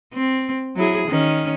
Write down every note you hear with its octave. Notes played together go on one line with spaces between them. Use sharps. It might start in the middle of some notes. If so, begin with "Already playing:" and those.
C4
F#3 E4 G#4
D#3 C#4